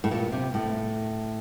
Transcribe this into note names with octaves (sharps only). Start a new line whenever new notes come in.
A2
A#2
C3
A2